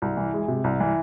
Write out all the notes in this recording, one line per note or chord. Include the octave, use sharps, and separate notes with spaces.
C2
E3
G#3
C3
C2
E3